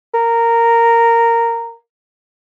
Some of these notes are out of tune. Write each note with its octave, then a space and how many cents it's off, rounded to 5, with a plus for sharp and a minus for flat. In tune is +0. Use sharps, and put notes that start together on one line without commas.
A#4 -10